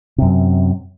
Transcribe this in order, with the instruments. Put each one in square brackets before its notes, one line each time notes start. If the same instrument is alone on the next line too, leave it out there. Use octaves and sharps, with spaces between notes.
[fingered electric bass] F#2 C3